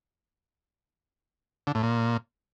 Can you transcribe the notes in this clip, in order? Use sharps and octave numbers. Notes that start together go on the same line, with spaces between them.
D3
A2
A#2